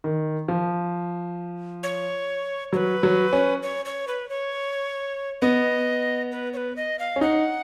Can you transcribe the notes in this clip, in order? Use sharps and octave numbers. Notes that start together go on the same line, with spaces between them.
D#3
F3
C#5
F#3 B4 C#5
F#3
C#4
C#5
C#5
B4
C#5
B3 D#5
B4
C#5
B4
D#5
F5
C#4
D#4 F#5